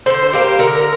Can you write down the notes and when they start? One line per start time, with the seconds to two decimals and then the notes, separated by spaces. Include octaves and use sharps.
0.06 D3 C5
0.33 G3 A#3 G4
0.59 D3 A#4